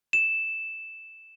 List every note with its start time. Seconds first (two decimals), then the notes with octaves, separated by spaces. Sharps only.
0.13 E7